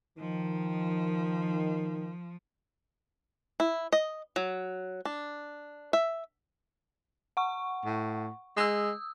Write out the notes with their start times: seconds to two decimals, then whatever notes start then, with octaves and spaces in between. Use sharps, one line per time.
0.18 D#3 F3
3.60 E4
3.92 D#5
4.36 F#3
5.05 D4
5.93 E5
7.37 F#5 C#6
7.85 A2
8.57 G#3 D#6 E6